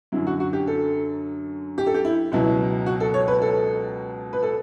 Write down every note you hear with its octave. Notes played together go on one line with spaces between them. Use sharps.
F#2 D3 F#3 E4
F#4
F#4
G4
A4
G4
A4
G4
E4
C#2 B2 F#3 E4
F#4
A4
C#5
B4
A4
B4
A4